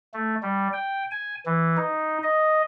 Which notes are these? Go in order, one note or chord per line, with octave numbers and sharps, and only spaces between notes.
A3
G3
G5
G#5
E3
D#4
D#5